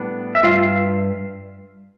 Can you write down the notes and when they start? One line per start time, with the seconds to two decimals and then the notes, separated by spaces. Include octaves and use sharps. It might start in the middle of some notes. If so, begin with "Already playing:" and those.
Already playing: A2 G3 B3 D4
0.35 E5
0.43 G2 E3 G3 F4 F5